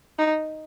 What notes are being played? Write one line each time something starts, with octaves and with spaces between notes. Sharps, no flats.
D#4